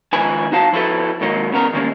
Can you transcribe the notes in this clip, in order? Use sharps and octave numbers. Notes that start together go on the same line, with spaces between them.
C#2 D#3 F3 B4 G#5
D#4 F#4 F5 A5
F3 E4 F#4 A4 B4
G#2 D#3 F#3 A#3
C#3 B3 A#4
D#3 G3 G#3 A#3 C4 C#4